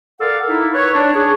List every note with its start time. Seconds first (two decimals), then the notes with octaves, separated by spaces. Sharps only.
0.20 A4 A#4 D5 F5 F#5
0.49 D#4 E4
0.74 B4 C#5
0.94 D4
1.15 G#4 C#5